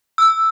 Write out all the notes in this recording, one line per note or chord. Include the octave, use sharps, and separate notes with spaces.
E6